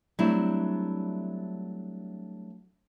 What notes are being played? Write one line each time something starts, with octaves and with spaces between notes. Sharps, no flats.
F#3 G3 A3 C4 D4 E4